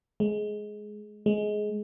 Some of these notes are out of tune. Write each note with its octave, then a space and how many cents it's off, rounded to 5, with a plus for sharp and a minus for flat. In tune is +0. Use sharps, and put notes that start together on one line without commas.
G#3 +15
G#3 +15